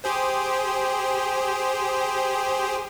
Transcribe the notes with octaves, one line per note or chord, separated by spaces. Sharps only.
G4 G#4 C5